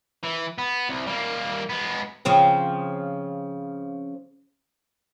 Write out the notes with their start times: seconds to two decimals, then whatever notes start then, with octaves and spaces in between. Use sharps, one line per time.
0.24 E3
0.58 B3
0.89 C2
1.07 G3 A#3
1.69 G#3 B3
2.25 C#3 F3 C4